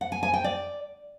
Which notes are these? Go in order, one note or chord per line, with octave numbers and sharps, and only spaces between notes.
F#5
G#5
G#5
G5
D5